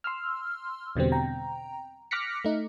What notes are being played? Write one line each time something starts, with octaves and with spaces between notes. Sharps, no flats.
C6 E6 F6
E2 B2 D3 G3 C4
G5 A#5
D6 F6 F#6 A#6 B6 C#7
A3 D#4